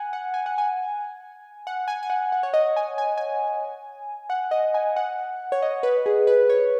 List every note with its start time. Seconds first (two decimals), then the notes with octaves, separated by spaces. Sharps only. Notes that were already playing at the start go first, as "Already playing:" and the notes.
Already playing: F#5 G#5
0.13 F#5
0.34 G#5
0.46 F#5
0.58 G#5
1.67 F#5
1.88 G#5
2.03 G#5
2.10 F#5
2.32 F#5
2.43 C#5
2.54 D#5
2.76 G#5
2.98 G#5
3.18 G#5
4.30 F#5
4.51 D#5
4.74 G#5
4.96 F#5
5.52 C#5
5.62 D#5
5.83 B4
6.06 G#4
6.27 B4
6.50 C#5